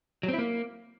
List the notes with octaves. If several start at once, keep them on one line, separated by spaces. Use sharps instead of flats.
F#3
C4
E4
A#3